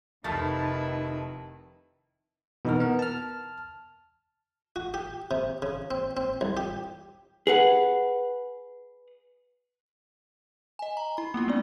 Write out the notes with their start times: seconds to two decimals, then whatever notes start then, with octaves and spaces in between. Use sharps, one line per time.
0.24 F1 D#3 F3 A3 E4 A#4 B4 A6
2.65 B2 E3 D#4 F#4 A#4
2.80 B3 A#4
2.99 A5 F6
4.76 F#4
4.94 G4
5.31 C3
5.62 C#3
5.91 C4
6.17 C4
6.41 C2
6.57 G4
7.47 G#4 B4 F#5
10.79 D#5 G#5
10.97 A#5
11.17 E4 B5
11.34 A#3 B3 E4 F4
11.47 G#3 C4 D4 D5